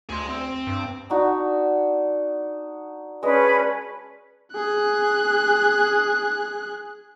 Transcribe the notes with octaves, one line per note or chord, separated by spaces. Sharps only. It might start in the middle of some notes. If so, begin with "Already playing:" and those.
D2 G#4 C6
C4
G2
D4 D#4 F#4
G#3 C#4 D4 B4 D#5
G#4 F#6